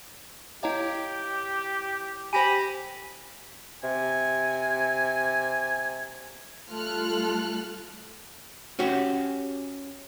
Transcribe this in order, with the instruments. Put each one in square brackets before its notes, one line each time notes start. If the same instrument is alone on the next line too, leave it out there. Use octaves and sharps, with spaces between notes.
[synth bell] E4 C#5 F5 [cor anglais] G4 [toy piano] D#5 A#5
[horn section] G4 B5 [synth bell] C5 A#6 D#7 [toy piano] G#5
[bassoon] C3 [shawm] G#5
[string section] G3 A3 F4 A4 F6 F#6
[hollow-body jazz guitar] C#4 F#4 G4